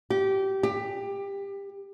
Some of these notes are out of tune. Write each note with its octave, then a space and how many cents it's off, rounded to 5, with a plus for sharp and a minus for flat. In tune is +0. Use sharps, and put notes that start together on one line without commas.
G4 -20
G4 +20